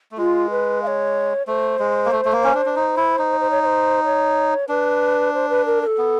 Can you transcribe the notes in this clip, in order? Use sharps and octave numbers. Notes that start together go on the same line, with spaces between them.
A3
G#3 F4
B4
F5
C#5
A3 C5
G#3
A#3
A3
A3
A#3
C#4
D4
D4
D#4
E4
D#4
C5
C#5
C#5
C5
C#5
D4 B4
C5
B4
A#4
A#4
A4
B3